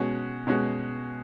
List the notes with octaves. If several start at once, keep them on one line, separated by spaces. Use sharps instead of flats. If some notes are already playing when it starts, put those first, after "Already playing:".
Already playing: B2 G#3 C#4 F#4
B2 G#3 C#4 F#4